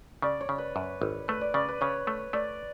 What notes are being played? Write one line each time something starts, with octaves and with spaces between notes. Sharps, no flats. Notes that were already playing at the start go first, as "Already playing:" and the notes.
C#3 D5
C#5
C#3
B4
F#2
G#1
A3 B4
D5
C#3 D5
B4
C#3 C#5
A3
A3 D5